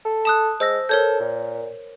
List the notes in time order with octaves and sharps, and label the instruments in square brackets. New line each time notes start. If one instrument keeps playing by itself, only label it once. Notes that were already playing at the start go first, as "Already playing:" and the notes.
[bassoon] A4
[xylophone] A5 D#6 F#6
[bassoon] G#3 [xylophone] C5 E6 A#6
[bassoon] A4 [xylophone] A#4 C#5 G6
[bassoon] A#2